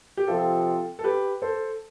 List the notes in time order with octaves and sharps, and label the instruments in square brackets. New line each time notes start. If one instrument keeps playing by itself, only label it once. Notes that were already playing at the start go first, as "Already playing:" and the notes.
[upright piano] G4
[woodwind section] C3 F3 C4 [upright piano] F4 A4
[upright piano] A4
G4 B4
A4 C5